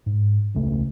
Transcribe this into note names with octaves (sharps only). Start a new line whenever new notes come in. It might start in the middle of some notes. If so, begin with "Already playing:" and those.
G#2
E1 C#2 C#3 A3